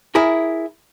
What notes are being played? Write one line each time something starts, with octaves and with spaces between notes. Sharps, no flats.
E4 G#4 A#4